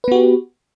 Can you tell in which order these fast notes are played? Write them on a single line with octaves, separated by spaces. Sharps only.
B4 B3 F#4 G4